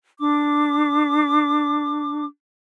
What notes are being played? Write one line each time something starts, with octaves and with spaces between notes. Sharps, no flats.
D4 D6